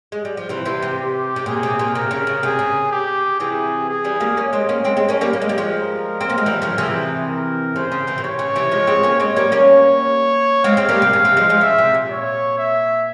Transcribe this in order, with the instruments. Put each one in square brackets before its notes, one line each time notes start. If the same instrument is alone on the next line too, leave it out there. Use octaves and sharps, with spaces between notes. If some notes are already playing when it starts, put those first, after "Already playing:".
[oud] G#3
G3
F3
[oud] C3 E3 [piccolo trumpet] C5
[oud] C3 E3
C3
[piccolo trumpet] G4
[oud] C3
[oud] A#2 [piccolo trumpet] G#4
[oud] C3
A#2
[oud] C3 [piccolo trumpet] A#4
[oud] C#3
C#3
[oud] C3 [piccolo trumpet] G#4
[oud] C#3
[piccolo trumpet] G4
[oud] C3 E3 [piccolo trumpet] G#4
[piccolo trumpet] G#4
[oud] E3 G3
G3 A#3
A#3 C#4
G#3 C4
A#3 C#4
G#3 C4
G#3 C4
A#3 C#4
G3 A#3
A#3
G#3
G3
F3 G#3
[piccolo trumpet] A#4
[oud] C4
A#3
G#3
E3 G3
C#3 F3
[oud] C3 E3 [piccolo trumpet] G#4
[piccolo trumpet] A#4
[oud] C#3 [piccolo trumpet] C5
[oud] C#3
C3 E3
A#2
[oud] C3 [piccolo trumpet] C#5
[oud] C#3
C3 E3
F3 G#3
G#3 C4
A#3 C#4
[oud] G#3 C4 [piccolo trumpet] C#5
[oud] G3 A#3
A#3 C#4
[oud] G#3 C4 [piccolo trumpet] F5
[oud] G#3 C4
G3 A#3
C3
C#3
C3 E3
F3 G#3
F3 G#3
[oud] C#3 [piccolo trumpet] E5
[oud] C3
A#2
[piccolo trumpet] C#5
E5